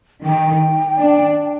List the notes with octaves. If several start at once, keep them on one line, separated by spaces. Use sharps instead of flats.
D#3 G5
D4